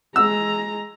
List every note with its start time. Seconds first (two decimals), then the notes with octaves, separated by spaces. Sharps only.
0.16 G#3 A#5 E6